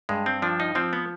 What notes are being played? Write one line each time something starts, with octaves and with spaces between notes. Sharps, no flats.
G2 G#3
C4
F3 D4
D#4
F3 C4
B3